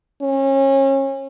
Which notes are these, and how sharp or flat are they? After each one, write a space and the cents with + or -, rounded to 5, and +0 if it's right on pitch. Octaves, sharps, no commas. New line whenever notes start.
C#4 -30